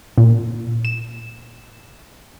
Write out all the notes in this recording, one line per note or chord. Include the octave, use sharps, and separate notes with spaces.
A#2
E7